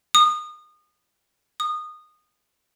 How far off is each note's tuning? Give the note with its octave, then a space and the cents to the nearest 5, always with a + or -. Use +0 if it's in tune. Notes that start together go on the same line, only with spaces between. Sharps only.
D#6 -30
D#6 -20